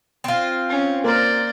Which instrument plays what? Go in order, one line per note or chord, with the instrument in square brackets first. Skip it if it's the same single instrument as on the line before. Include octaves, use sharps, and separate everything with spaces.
[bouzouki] C4 F4
[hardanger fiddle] C#4
[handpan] A#3 A#4 [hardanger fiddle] C5 D5